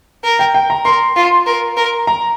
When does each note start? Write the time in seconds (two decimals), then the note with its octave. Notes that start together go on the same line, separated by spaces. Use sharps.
0.24 A#4
0.39 G5
0.54 G5
0.70 A#5
0.85 A#4 C6
1.16 F4
1.46 A#4
1.77 A#4
2.07 A#5